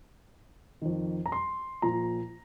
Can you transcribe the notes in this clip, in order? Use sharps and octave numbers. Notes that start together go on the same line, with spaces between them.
F2 D#3
A#5
C6
A#2 F3 A#5